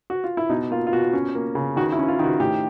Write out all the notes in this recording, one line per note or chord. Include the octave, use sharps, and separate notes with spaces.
F#4
F4
E4
B2 D#4
A#3 F4
F4
B2 F#4
C#4
A#3
C#3
D#3 F#4
E4
C#4
F4
D#3
F#4
A2 G4